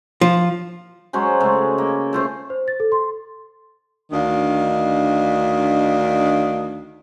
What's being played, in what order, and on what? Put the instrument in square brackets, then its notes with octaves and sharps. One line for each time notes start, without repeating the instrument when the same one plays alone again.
[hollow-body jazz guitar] F3
[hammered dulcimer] F#3 G#3 C#4 C5
C#3 G#3 A3
A#3
A3 F4 C5
[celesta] C5
A6
A4
C6
[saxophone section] D2 D#3 D4 D#5 F5